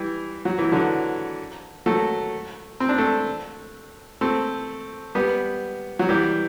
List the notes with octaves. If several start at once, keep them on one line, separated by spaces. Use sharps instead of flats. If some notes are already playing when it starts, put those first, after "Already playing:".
Already playing: E3 G3
F#3
E3
D3 F#3
F#3 A3
C4
D4
A3 C4
A3 C4
G3 B3
F#3
E3 G3